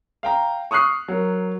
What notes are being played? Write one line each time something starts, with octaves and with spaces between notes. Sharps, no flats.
F5 G5 A#5
C#6 D#6 F6 F#6 C7
F#3 A#4